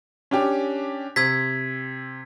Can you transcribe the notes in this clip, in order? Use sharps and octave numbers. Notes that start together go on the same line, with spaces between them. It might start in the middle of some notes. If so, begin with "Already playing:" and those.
C#4 D4 G4
C3 E6 G#6 B6